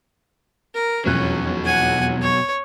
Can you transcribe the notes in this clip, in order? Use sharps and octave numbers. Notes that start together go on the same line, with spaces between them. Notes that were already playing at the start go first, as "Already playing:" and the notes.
A#4
E1 F2 B2 F#3 C#4 F#6
F#5 G#5
C#5